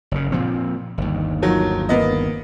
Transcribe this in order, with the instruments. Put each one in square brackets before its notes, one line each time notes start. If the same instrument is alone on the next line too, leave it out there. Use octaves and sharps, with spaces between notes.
[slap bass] F#1 C#3
A#2 F3 C4
G1 D#2
[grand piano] D#3 F3 F#3
A#3 B3 D#5